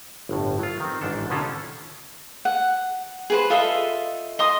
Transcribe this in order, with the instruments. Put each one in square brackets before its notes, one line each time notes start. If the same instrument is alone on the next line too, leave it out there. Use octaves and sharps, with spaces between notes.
[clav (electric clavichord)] G1 A2
F#3 F4
D#3 C4
A1 G#2 D4 A4
B2 D3 D#3 C#4 F4 A4
[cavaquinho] F#5
G#4 B4 C5
F4 A4 D#5 E5
D#5 C6 D#6